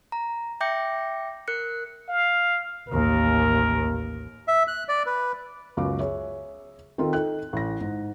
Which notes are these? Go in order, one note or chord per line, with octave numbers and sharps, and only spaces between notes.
A#5
E5 G5 D6 G6 A#6 C#7
A#4 F#6 C#7
F5
A1 D#2 A#4
E5
F#6
D5
B4
C#2 F#2 B3 F#4 F5 D6
G#4 C#5 E5
D#3 C4 F4 A4 A#4
D#4 A4 G5 F#6
A1 A#6
G#2